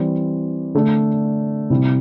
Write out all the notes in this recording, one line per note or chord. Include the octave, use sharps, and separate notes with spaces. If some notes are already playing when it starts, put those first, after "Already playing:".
Already playing: E3 G3 C4
D3 A3 D4
C3 G3 C4 E4